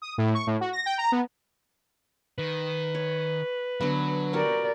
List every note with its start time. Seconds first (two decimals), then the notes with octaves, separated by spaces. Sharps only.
0.02 D#6
0.18 A2
0.34 C#6
0.47 A2
0.61 F#4
0.73 A#6
0.86 G5
0.98 A#5
1.12 B3
2.38 D#3 B4
2.95 C#5
3.81 D3 F#3 B3
4.33 F#4 G4 A#4 C#5 D5